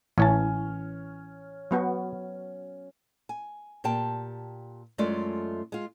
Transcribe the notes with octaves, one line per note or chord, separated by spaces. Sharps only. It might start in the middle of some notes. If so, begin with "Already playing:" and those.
A1 E3 C#4 C#5 A5
F#3 B3 F#4
G#5
A#2 G4 G5 A5
F#2 G#3 A3 F4 A4 D5
G#3 F4